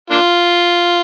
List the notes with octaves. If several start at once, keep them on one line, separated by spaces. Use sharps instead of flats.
A#3 D4 F4